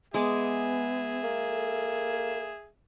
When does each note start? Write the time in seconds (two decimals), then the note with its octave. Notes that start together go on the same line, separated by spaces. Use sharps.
0.14 G#3 B3 G#4 E5 D6
1.24 A#3
1.48 A4